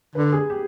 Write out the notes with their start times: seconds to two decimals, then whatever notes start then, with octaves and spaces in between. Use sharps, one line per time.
0.15 D3 B4
0.32 G#4
0.50 G4